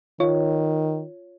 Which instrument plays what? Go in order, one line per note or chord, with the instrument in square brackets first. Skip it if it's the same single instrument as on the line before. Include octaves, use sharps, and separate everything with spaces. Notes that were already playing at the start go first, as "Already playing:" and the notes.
[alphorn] D#3 [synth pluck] F4 C#5